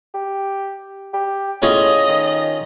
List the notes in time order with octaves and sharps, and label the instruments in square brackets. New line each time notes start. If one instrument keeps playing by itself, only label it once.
[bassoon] G4
G4
[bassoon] A2 [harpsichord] C#4 F4 G#4 [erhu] D#5
[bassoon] D#3